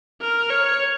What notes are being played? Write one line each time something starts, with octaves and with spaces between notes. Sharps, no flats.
A#4
C#5